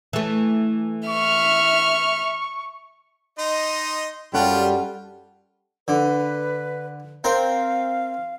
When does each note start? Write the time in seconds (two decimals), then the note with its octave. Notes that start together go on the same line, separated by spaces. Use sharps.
0.13 E3 A3
1.09 E5 C#6 F6
3.39 D#4 D#5 C6
4.34 F#2 G3 C#4 F4 A4 F#5 G5
5.88 D3 B4
7.24 C4 A#4 C5 F5